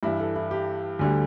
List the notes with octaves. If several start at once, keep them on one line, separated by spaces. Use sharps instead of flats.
G2 E3 G3 E4
A4
E4
G4
D2 D3 G3